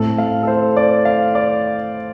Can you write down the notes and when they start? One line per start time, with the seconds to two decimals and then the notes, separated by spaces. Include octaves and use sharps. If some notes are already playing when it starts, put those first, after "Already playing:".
Already playing: A2 A3 C4 A4
0.18 F5
0.43 A4
0.47 C5
0.77 D5
1.05 F5
1.35 D5